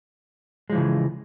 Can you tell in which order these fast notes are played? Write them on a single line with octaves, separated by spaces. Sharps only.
G#3 F3 E3 C#3